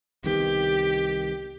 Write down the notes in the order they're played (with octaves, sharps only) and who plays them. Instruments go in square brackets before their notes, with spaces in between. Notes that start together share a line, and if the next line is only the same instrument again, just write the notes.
[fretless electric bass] C2 D#3 B3 [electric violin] G4